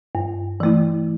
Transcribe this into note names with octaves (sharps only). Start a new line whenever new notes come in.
G2
E3 A3 E4